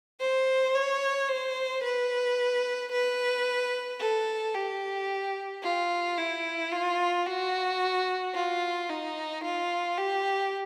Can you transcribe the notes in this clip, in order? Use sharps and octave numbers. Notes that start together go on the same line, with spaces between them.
C5
C#5
C5
B4
B4
A4
G4
F4
E4
F4
F#4
F4
D#4
F4
G4